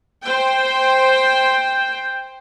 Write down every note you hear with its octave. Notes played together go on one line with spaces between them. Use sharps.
C5 G5